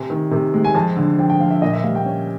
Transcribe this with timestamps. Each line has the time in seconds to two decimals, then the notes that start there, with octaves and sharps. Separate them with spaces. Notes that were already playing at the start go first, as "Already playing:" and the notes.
Already playing: C3 G#5
0.10 D#3
0.31 C3
0.54 G#3
0.64 G#5
0.75 F2 A5
0.97 D3
1.19 F2 G5
1.29 G5
1.40 F3 F5
1.50 E5
1.62 A#2 D#5
1.73 E5
1.84 G3 F5
1.95 G5
2.06 C#4